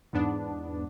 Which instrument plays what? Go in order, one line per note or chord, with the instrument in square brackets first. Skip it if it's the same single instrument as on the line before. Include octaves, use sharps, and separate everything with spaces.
[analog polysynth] E2 G#2 B3 D4